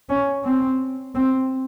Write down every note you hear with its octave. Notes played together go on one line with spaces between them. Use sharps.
C#4
C4
C4